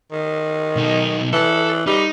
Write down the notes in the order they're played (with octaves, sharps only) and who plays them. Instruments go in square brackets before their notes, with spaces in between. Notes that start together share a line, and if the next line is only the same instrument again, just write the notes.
[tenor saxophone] D#3
[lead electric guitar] B1 D#4
[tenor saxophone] E3 [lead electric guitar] A4
[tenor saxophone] G3 [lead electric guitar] D#4